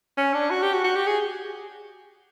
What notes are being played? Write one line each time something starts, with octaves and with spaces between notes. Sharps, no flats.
C#4
D4
F#4
G4
F#4
F#4
G4
G#4